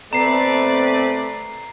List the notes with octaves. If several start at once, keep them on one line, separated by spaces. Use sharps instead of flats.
B2 A3 C4 B4 D5 A#5 C7